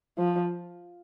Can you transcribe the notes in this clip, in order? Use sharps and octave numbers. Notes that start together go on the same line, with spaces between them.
F3